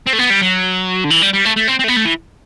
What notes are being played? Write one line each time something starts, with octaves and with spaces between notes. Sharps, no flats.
C4
A3
B3
G3
F#3
D3
E3
G3
G3
A3
A3
C4
C4
A3
B3
A3
E3